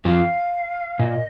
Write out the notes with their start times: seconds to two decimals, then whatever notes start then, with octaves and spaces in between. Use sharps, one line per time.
0.05 F2 F3 F5
0.99 A#2 D#5